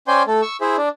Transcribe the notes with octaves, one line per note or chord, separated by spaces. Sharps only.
C#4 C5 D5 G5 G#5 C6
A3 A4
C#6 E6
E4 G#4 C5 E5
D4 D5